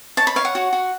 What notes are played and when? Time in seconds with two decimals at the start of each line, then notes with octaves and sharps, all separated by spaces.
0.17 C#5 A5
0.27 B5
0.36 C#5 F5
0.45 F#5
0.55 F#4
0.73 F#4